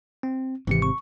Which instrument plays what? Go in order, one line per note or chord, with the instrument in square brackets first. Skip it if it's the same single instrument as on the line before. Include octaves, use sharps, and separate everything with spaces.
[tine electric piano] C4
[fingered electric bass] G#1 C3 [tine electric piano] E3 C4 C#7
[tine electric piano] C#6